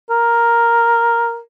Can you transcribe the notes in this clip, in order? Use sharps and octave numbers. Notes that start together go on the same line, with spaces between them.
A#4